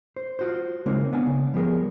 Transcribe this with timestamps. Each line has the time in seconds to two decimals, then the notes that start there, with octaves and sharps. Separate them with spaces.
0.16 C5
0.39 F4 F#4 C5
0.86 C#3 G#3 A#3 C4 D#4
1.13 B3 D4 F5 G#5
1.27 C#3
1.54 F3 G3 B3 G#4 A#4